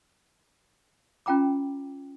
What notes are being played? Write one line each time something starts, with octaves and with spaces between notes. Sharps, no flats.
C#4 F4 G5 A#5 D6